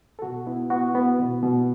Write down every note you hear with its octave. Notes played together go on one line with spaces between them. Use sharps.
A4
B2 F#4
B3 E4
B3 F#4
B3
B2
B2